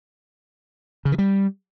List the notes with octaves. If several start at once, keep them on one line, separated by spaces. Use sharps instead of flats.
C#3
E3
G3